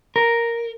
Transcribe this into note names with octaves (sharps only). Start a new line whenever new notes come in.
A#4